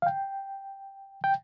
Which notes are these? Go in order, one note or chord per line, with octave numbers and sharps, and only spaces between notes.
F5
G5
G5